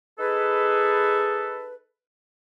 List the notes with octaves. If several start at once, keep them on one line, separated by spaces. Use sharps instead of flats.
D#4 G#4 A4 B4